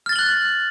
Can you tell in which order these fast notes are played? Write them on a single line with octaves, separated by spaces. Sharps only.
F6 A6 G7 F#7 F#6